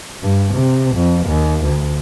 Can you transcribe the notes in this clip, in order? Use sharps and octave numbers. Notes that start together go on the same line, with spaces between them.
G2
C3
F2
D#2
D2